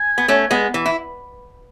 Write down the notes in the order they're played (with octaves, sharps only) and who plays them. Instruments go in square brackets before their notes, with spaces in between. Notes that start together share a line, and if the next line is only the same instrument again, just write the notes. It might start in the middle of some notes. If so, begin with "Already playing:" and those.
Already playing: [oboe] G#5
[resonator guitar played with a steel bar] B3
A3 C#4
G#3 B3
E3
E4